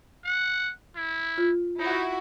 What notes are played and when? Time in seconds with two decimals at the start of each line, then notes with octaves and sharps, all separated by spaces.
0.24 F#5
0.96 E4
1.38 F4
1.79 D#4 E4 F#4